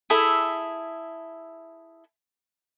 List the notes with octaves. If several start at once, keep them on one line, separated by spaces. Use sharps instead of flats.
E4 G#4 A4 E5